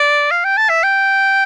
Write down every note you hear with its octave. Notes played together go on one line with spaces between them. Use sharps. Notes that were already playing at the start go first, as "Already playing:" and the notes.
Already playing: D5
F5
G5
A5
E5
G5